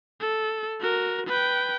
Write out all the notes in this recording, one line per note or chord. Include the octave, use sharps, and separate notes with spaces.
A4
F#4 A#4
B4 G5